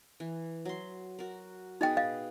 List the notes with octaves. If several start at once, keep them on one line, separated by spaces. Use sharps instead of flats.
E3
F#3 C6
F#4 A#4
B2 D#4 G#4 B4 D#5 G5
D#5 F5